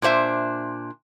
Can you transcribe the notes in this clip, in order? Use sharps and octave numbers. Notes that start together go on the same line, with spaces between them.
A#2 D4 C5 E5